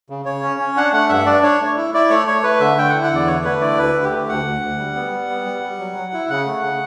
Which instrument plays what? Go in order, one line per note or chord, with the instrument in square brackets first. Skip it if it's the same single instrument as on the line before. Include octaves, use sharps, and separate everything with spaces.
[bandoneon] C#3
C#3 C#5
C#4
C#4
D4 F#5
A3 F#5
G2 E5
D4 D5
D4 C#5
A3
E4
E4 D5
A3 C#5
A3 C#5
A3 B4
D3 E5
D3 G5
E4 F#5
F#5
E2 D5
D3 C#5
A3 B4
E4 D5
D2 B4
D3
G4
A3
D2 F#5
D2
D2
G3
B3
G3
B3
G3
G3
F#3
F#3
E4
C#3 F#5
A3
C#3